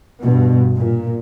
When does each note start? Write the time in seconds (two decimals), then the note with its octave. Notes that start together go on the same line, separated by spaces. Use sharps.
0.21 G2 B2
0.75 A#2